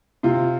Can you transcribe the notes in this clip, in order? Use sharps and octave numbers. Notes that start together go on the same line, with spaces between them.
C3 F4